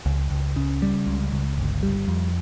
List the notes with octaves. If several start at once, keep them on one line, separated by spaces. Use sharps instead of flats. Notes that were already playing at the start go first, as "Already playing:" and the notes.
C#2
C#2
C#3
G3
C#2
C#2
G1
G3
F2